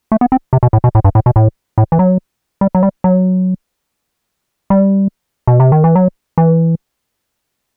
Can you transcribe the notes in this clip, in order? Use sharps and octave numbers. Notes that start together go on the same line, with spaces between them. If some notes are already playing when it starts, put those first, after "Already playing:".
A3
B3
C4
C3
B2
A2
B2
A2
G2
A2
B2
A2
A2
E3
F#3
G3
F#3
G3
F#3
G3
B2
C3
D#3
E3
F#3
E3